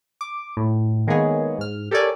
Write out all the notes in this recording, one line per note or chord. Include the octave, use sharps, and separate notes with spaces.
D6
A2
D#3 G#3 A#3 B3 G#4 C#5
G#2 F6
G4 A4 A#4 C#5 D5 G#5